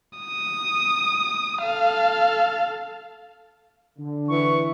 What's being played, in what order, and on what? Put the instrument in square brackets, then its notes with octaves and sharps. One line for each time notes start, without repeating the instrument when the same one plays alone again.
[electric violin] D#6
A4 F5
[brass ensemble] D3
[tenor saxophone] E3 [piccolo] C#6